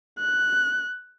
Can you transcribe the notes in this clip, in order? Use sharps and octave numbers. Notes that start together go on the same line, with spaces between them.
F#6